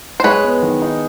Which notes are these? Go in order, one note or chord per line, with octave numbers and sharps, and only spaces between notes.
C5
G#3 B4 C#5
B3
D#3
D#4